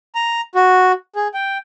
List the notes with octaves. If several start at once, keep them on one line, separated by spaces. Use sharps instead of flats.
A#5
F#4
G#4
G5